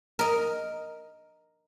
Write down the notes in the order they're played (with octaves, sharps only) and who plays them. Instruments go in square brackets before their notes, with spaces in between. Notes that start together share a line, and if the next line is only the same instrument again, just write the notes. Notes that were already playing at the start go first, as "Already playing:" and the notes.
[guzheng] A#4 D#5